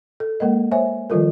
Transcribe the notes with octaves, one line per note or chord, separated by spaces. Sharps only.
A4
G#3 A#3 A#4 D#5
C5 C#5 E5 G#5
D#3 F3 G3 F4 A4 A#4